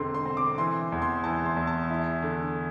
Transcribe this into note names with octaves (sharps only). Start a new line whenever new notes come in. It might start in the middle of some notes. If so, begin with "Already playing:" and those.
Already playing: E1 D3 C4 C6
C6
C4
D6
E3 C6
E2
C6
E3 A5
C6
E2
A5
E4
D3